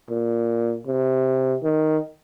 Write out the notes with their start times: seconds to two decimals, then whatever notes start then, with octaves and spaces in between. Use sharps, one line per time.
0.10 A#2
0.87 C3
1.63 D#3